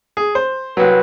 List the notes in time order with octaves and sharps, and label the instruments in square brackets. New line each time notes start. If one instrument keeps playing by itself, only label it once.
[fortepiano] G#4
C5
[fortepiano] C2 F#3 [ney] B4